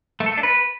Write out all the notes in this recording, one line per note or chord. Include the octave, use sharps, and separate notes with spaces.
A3
A4
A3
D4
B4